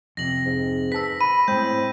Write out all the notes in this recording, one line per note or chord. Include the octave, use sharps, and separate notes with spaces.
F2 C3 A#6 F#7
G#2
B4 A5 E6 B6
B5 D#7
A2 G#3 C4 G6